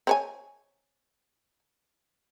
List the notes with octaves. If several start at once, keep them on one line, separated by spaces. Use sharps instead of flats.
C4 C#5 G#5